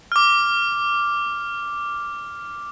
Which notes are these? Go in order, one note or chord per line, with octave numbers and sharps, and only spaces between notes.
D6 F6